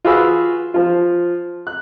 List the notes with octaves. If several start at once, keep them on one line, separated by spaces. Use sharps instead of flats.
F4 F#4 G#4 B4 E6
F3 F4
F#6